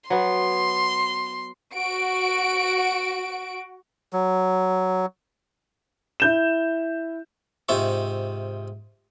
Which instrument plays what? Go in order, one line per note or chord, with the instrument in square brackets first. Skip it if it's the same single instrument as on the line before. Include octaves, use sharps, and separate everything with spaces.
[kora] F#3 B3 [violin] C6
[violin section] F#4 D7
[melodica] F#3
[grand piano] E4 G6 E7
[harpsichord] G#2 C3 F4 E5 C#6